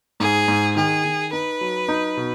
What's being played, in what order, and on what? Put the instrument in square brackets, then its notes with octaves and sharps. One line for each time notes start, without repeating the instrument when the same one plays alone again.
[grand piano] G#2 [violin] G#4
[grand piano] G#2
[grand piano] D#3 [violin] G#4
[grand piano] D#3
[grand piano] D#4 [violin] B4
[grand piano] F#3
D#4
B2